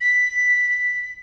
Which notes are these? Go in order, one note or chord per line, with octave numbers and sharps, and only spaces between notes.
B6